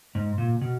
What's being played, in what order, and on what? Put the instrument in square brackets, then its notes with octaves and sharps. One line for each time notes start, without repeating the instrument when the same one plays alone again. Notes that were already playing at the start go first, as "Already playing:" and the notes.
[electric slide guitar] G#2
A#2
B2